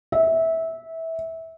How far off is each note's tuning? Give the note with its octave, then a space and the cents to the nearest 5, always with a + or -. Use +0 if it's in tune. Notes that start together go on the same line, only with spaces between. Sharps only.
E5 -20